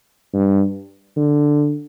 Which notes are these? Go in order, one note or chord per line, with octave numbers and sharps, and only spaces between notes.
G2
D3